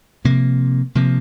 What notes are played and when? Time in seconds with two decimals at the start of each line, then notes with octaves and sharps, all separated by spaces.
0.24 C3 F3 A#3
0.95 C3 F3 A#3